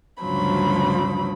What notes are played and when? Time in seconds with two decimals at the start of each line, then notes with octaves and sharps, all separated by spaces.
0.22 D2 G2 C#3 F3 F#3 B5